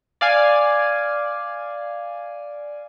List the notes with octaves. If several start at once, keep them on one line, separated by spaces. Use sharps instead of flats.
D5 F5 G#5